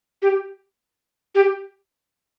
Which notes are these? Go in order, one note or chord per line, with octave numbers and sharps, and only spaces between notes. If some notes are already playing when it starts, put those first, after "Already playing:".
G4
G4